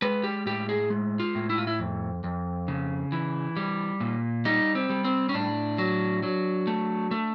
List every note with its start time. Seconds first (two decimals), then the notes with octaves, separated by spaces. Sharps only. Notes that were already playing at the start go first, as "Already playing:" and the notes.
0.02 G#3 B4
0.23 G4
0.46 A2 G4
0.69 G#4
0.90 G#3
1.20 F4
1.35 A2
1.50 E4
1.58 F4
1.67 E4
1.80 F2
2.24 F2
2.68 C#3
3.12 E3
3.57 G3
4.00 A#2
4.45 G3 D#4
4.75 C4
4.90 G3
5.04 C4
5.29 C#4
5.34 A2 D4
5.78 F#3
6.23 F#3
6.67 A3
7.11 A3